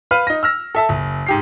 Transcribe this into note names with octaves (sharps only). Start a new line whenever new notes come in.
B4 F5 F6
D#4 A#6
E6 F6 A#6
A4 E5 A5
F#1
G#2 G4 C7